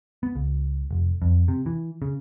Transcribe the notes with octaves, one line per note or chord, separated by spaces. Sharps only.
B3
C#2
F1
F2
C3
E3
C#3